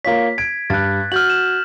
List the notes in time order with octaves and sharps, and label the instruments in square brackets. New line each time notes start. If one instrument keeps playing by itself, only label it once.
[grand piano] A#3 F4 C#5 [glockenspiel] B6
[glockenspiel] G#6 [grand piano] D7
[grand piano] G2 [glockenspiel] F#6 G#6 A6
[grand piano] F#4 [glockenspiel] F6 G6 F#7
[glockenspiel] E7